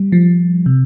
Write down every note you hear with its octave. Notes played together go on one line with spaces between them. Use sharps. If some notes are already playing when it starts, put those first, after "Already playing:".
Already playing: G3
F3
C3